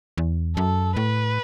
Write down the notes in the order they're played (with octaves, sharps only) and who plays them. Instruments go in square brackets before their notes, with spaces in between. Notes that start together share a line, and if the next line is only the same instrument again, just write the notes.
[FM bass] E2
[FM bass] F#2 [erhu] A4
[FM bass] A2 [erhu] B4